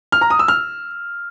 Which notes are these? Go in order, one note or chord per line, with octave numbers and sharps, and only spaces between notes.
F6
A#5
D#6
E6
F6